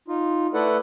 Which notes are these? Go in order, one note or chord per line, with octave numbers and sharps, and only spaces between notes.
D#4 F4
A3 E4 A4 B4 D5 F#5